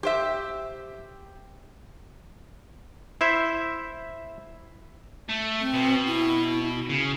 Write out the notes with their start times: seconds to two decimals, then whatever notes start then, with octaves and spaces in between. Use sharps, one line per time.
0.03 G4 C5 E5
3.21 E4 C5 E5
5.29 A3
5.60 C4
5.74 B2
6.07 E4
6.90 C#3